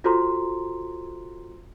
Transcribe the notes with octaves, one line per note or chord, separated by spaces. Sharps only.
F4 F#4 A4 C5 A#5 C6